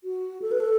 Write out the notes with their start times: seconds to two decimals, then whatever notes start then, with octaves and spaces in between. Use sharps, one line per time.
0.04 F#4
0.42 A4
0.51 B4
0.60 A4